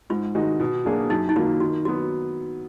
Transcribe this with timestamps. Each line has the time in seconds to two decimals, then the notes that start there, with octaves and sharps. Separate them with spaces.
0.10 G#2 F4
0.35 D#3 G#3 D#4 F#4
0.59 B2
0.85 F#3 A#3 D4 G#4
1.10 F#2 D#4
1.29 D#4
1.36 D#3 F#3 A#3 F4
1.60 D#3 F#4
1.85 F#3 B3 F#4